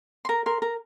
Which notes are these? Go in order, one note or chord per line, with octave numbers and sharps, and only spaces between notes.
C6
A#4 A#5
A#4 C6
A#4 A#5